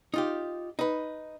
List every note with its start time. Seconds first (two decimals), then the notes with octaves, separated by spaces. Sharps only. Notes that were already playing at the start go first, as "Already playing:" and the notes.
0.14 D#4 F4 G4
0.79 D#4 B4